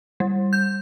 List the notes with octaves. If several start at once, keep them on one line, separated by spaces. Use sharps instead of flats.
G3
G6